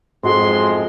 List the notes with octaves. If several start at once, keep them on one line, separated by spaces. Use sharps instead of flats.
B1 F2 G#2 G#3 F#4 A4 C6